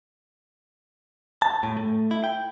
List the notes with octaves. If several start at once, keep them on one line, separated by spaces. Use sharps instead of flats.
A5
A2
A3
E4
G5